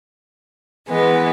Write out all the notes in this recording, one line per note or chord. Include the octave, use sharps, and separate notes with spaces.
E3 G#3 B3